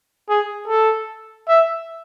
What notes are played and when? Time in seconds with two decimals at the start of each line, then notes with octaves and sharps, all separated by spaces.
0.29 G#4
0.67 A4
1.48 E5